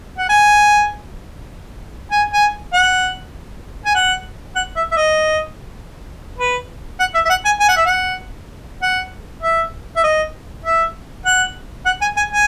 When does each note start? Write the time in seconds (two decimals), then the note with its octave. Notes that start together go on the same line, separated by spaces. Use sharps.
0.18 F#5
0.29 G#5
2.12 G#5
2.33 G#5
2.74 F#5
3.86 G#5
3.95 F#5
4.56 F#5
4.76 E5
4.92 E5
4.96 D#5
6.38 B4
7.00 F#5
7.15 E5
7.25 E5
7.30 F#5
7.45 G#5
7.60 G#5
7.69 F#5
7.77 E5
7.86 F#5
8.82 F#5
9.43 E5
9.97 E5
10.04 D#5
10.65 E5
11.25 F#5
11.86 F#5
12.02 G#5
12.17 G#5
12.32 G#5